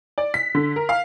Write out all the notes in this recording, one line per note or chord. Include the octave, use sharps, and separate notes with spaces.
D5
B6
D3
A#4
F5